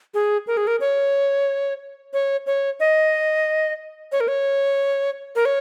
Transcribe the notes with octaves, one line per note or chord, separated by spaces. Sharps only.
G#4
A#4
G#4
A#4
C#5
C#5
C#5
D#5
C#5
A#4
C#5
A#4
C#5